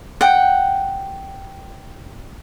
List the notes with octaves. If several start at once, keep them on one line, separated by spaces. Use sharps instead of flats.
F#5 G5